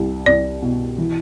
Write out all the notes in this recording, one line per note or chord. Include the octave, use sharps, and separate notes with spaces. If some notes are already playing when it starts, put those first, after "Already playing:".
Already playing: C2 G3
C2 D5
B2
E3